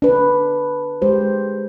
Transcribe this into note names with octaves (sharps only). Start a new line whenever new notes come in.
D4 B4
G#3 G4 C5